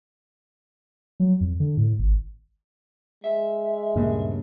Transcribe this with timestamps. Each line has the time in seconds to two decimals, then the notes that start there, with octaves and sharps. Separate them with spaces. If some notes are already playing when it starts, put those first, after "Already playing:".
1.20 F#3
1.41 F2
1.60 D3
1.77 A2
1.99 G#1
3.24 G#3 E5
3.96 D2 G2 A#2 C#3 A#3